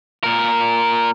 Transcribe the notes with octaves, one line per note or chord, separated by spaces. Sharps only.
A#2 A#4